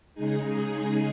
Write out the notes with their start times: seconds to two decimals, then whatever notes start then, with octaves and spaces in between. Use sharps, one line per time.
0.14 C#3 G#3 D#4 G#4
0.69 G#4